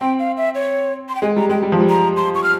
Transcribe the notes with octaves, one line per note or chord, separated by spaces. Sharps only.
C4 G5
F5
E5
C#5
C6
G5
G#3 G#5
G3 A#5
G#3 G5
G3
F3
G3
A#5
C6
C#6
F6